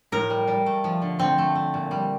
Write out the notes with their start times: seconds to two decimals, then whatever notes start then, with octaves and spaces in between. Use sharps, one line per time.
0.12 A2 A#4
0.30 G3
0.47 G3
0.66 A3
0.84 F3
1.02 D3
1.19 D3 C4
1.38 A3
1.55 A3
1.74 A#2
1.91 G3